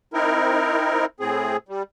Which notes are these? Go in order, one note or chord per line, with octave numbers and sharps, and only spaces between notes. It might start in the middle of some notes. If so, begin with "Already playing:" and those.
C4 D#4 E4 A#4
A2 C4 G#4
G3